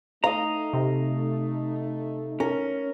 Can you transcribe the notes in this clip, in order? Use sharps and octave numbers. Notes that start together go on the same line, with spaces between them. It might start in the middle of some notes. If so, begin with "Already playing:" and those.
A3 D#4 D#5 F5 A#5
C3
C#4 A#4